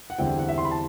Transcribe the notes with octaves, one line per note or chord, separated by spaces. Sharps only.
F#5
E2 D3 G3 C4 E4 G5
F#5
E5
C6
B5
A5